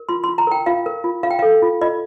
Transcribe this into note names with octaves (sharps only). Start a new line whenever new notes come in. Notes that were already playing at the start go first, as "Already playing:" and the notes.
Already playing: A#4
F4 C6
C6
F4
A#5
A#4 G5
F4 F5
A#4
F4
F4 F5
G5
A4 F5
F4
F4 D#5